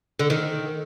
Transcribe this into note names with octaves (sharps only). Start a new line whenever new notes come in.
D3
D#3